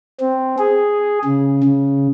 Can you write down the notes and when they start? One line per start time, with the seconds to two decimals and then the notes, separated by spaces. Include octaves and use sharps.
0.20 C4
0.58 G#4
1.25 C#3
1.64 C#3